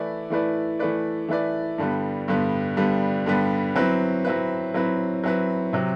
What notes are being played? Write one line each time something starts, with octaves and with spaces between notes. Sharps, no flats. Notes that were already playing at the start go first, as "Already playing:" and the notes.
Already playing: E3 A3 E4 B4 D5
E3 A3 E4 B4 D5
E3 A3 E4 B4 D5
E3 A3 E4 B4 D5
G2 D3 G3 B3
G2 D3 G3 B3
G2 D3 G3 B3
G2 D3 G3 B3
F#3 C4 E4 B4
F#3 C4 E4 B4
F#3 C4 E4 B4
F#3 C4 E4 B4
C3 F#3 C4